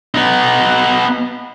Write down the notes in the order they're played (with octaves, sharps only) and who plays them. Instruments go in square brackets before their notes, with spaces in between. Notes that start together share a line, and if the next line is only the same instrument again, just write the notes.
[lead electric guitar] B3 D#4